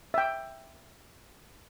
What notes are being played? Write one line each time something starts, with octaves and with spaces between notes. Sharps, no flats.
E5 G5